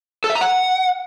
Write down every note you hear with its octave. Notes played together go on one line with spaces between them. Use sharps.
A4
E5
A#5
F#5